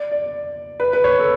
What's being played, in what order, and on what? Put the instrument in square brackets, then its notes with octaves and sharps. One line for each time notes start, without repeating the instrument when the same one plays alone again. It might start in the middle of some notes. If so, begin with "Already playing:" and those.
Already playing: [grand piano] D5
D5
B4
B4
C#5
A4